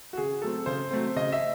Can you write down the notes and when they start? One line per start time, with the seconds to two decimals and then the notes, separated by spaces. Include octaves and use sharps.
0.13 F#4
0.17 C#3 G#4
0.42 F#3 A3 C4 A4
0.66 C#3 C5
0.91 F#3 A3 C4
1.16 C#3 D#5
1.32 E5